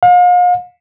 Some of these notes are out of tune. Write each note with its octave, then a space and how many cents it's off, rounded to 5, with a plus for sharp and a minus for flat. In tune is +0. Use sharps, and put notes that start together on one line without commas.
F5 +40